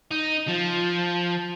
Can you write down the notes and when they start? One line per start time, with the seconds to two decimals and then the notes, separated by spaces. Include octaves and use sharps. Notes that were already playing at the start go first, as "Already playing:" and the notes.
0.11 D#4
0.48 F3